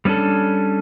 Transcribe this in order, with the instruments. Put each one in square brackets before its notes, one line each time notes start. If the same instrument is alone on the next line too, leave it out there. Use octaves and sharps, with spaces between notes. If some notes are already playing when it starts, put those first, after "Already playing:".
[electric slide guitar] G3 B3 C#4 D4 A4